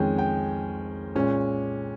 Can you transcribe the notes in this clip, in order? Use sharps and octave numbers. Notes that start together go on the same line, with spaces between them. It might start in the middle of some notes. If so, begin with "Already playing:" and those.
Already playing: F2 D#3 G#3 C#4 G5 G#5
G5
A#2 G#3 C#4